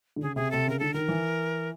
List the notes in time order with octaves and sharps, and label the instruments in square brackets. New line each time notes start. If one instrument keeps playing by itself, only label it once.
[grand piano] D3
[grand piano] C#3 [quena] G#4
[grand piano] C3 [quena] G#4
[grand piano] C3 [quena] A4
[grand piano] C#3 [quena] A#4
[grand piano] D3 [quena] A4
[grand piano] D#3 [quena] A#4
[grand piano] E3